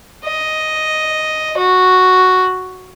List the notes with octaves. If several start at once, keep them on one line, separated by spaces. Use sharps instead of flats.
D#5
F#4